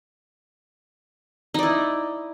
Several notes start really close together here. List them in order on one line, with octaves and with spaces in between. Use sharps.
D#4 D5 E4